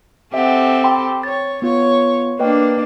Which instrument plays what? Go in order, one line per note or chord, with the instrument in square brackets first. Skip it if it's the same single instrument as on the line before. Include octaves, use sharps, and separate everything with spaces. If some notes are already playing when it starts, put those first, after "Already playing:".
[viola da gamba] C4 G4 A4 [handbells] E5 F#5
[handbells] G5 B5 C6
[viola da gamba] C#5 [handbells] A6
[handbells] B3 F4 [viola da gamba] C#5
[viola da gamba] A#3 D4 [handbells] B4 D#5 G5